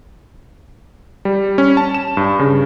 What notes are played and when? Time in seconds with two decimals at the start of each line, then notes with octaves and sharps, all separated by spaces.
1.25 G3
1.58 C#4
1.77 A5
1.94 E7
2.17 G2
2.39 C#3